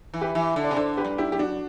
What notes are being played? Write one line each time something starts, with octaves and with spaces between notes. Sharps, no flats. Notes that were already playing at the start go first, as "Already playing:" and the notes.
E3
G4 B4
E3
D3
D5
C3
D3 A4 C5
G4 B4
G2
E4 G4
F#2 G4
D4 F#4